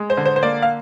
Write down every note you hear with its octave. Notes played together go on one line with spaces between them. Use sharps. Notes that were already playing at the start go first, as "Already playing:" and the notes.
Already playing: G#3
C5
D3
C5
C5
A#3 D5
F5